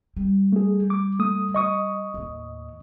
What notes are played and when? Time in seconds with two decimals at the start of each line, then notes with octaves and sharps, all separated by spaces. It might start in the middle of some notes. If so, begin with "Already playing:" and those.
0.17 G3
0.52 A3 G#4
0.90 D6
1.19 A3 D#6
1.55 D#5 C#6 D#6
2.14 D#2 A2